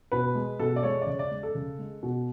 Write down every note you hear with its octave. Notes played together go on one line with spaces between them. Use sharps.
B2 B4
G#3
B2 A4
D5
G#3 C#5
D5
C#3 C#5
D5
G#3
A4
C#3
G#3
B2